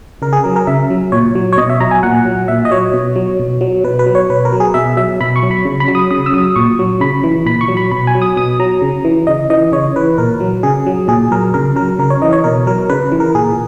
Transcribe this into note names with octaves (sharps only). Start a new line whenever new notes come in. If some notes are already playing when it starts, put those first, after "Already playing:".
C#3 A#4
G#4
F#3 A#4
A#4
C#3 E5
F#3
A#2 C#5
F#3
C#5
B2 D#5
E5
F#3 A#5
G#5
A#2 F#5
F#3
A#2 E5
D#5
F#3 C#5
B2
F#3
B2
F#3
B2 B4
B4
F#3
C#5
B2 B4
A#4
F#3
G#4
B2 E5
F#3 E5
B2 B5
C#6
F#3
B5
C#3
B5
F#3
D#6
C#3 D#6
E6
F#3 D#6
A#2 C#6
F#3
C#3 B5
E3
A#2 B5
C#6
F#3
B5
B2 B5
G#5
F#3
D#6
B2 D#6
F#3 A#5
C#3
E3
C#3 D#5
E3 D#5
C#3 C#5
E3 B4
A#2 A#4
F#3
C#3 G#4
F#3
A#2 G#4
F#3 A#4
C#3 A#4
F#3 A#4
C#3 A#4
C#5
E3 D#5
C#5
B2 A#4
F#3 A#4
C#3 B4
E3
A#4
A#2 G#4